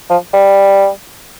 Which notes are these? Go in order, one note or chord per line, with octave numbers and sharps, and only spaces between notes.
F3
G3